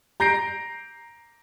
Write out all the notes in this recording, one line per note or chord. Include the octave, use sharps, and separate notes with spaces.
A#5 G6 A#6 C7 D7